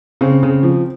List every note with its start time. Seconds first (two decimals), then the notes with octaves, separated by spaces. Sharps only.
0.21 C#3 C4
0.43 C#3
0.63 F3